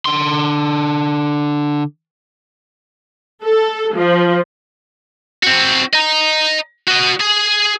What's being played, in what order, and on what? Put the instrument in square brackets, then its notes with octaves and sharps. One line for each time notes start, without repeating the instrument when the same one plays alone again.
[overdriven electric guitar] D3 C6
[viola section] A4
F3
[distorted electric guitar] C4 F#4
D#5 A#5
F#4 D#5
G#4